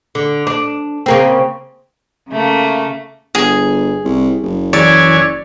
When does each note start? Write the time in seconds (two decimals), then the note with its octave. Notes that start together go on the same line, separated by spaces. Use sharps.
0.15 D3
0.47 D4
1.06 C#3 A#3 C4
2.30 C#3 A3 A#3
3.35 G1 G#4
4.05 C2
4.43 F#1
4.73 E3 C#5 D5 G#5